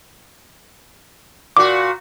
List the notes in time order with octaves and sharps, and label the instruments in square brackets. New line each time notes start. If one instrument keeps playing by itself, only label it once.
[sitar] A#2 F#4 [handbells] D6